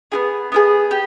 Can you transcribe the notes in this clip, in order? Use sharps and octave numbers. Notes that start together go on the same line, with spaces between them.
B3 E4 G#4
B3 E4 G#4
G4